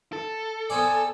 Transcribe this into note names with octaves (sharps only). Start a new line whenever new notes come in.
A4
B3 C4 D5 G#5